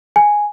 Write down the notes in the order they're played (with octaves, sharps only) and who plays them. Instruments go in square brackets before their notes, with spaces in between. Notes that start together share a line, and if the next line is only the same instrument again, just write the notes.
[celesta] G#5